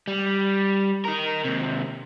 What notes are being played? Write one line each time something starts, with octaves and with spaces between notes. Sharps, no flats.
G3
D#4 A#4
D#2 C3